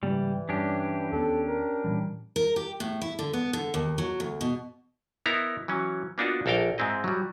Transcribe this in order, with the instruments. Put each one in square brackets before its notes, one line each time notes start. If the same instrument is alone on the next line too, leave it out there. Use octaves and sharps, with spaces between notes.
[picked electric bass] G#2 C#3 A#3 [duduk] E3 [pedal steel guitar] G3
[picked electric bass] G2 [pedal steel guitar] C#4 D4 G4
[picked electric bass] D#2 B3 [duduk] A4
[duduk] A#4
[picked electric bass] A#2 E3 G3
[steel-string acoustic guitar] A#4
G4
A2
E4
D3
B3
D3
D#2
F#3
D2
B2
[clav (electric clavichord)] B3 D#4 E4 A#4 A#5
E3 F#3 C#4
A#3 B3 D4 D#4 F4 F#4
A#1 A4 A#4 F5 G5
G#2 G#3 C4 E4 D#5
F#3 G3